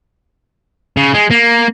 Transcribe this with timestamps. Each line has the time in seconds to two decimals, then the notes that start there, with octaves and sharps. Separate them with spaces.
0.97 C#3
1.14 G#3
1.31 A#3